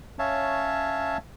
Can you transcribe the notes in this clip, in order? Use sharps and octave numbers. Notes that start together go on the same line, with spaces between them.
C#4 C#5 E5 F5 A5